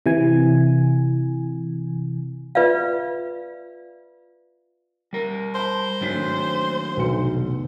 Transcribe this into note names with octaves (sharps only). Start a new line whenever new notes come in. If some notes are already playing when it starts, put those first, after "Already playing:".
C3 E3 G#5
F4 B4 D5 E5 F5
G3 A#4
C5 A5 B5
G#1 D#3 F#3 D4 B6
A3 A#3
F1 B1 B3 C#7